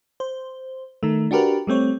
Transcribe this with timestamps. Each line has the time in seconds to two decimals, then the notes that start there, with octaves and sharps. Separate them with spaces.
0.20 C5
1.03 D#3 A3
1.31 D4 F#4 G4 A#4 B4
1.67 G3 A3 C4 C#5